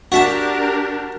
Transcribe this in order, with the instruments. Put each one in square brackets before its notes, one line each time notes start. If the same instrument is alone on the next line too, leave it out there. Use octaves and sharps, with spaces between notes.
[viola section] D4 G4 A#4 [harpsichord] F#4 E5 A5